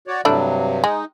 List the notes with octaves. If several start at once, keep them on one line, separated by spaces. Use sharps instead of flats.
F#4 C#5 D5
G2 C3 F#3 A3 D4 E4
G#3 D#4